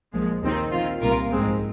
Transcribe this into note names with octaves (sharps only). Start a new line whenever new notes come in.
A#1 A#2 F3 G#3
D#2 D#3 C4 D#4
D#3 C4 F4
C2 A#2 A#3 F4 A#4
A#1 G#2 G#3 C4